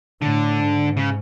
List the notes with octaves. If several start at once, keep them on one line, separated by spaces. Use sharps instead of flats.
A2 D3
G#2
C#3